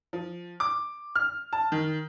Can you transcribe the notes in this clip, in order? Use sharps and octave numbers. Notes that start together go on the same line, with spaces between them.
F3
D6
F6
A5
D#3